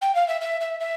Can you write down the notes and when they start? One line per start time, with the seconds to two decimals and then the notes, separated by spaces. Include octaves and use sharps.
0.01 G5
0.15 F5
0.28 E5
0.41 E5
0.60 E5
0.80 E5